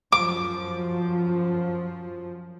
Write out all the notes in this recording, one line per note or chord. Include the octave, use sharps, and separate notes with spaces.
F#2 F3 D6